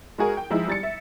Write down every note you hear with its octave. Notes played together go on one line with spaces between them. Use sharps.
G#3 F#4 G#4 A#4
G5
F3 G#3 D#4 E4
G3 A6 C#7
E5